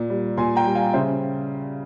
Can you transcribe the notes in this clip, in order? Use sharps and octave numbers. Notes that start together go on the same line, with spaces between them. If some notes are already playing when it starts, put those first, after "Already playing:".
Already playing: A#2
G3
A#2 G#5 C6
G5 A#5
G3
F5 G#5
C#3 C5 E5